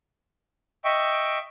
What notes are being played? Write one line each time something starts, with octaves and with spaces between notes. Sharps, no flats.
D#5 E5 G5 C#6